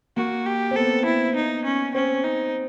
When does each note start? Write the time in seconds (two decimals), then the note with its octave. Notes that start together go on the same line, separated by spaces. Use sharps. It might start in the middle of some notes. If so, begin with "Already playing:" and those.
0.17 A#3 F#4
0.46 G4
0.71 C4
0.76 B3 A4
1.05 E4
1.36 D#4
1.65 C#4
1.94 C4 C#4
2.24 D#4